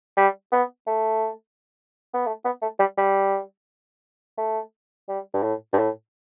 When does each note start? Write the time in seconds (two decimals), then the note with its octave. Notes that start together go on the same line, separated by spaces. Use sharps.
0.17 G3
0.52 B3
0.87 A3
2.14 B3
2.27 A3
2.45 B3
2.62 A3
2.80 G3
2.97 G3
4.38 A3
5.09 G3
5.34 G2
5.43 A2
5.73 G2
5.78 A2